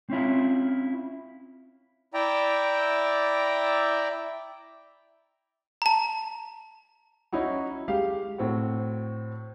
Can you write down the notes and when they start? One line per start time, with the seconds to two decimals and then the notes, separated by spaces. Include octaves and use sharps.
0.10 C4 C#4 E4 F4
2.14 E4 D5 E5 G5 A#5
5.82 A5 A#5
7.33 C#4 D#4 E4 F#4
7.88 G#3 G4 F5
8.38 A2 C4 F#4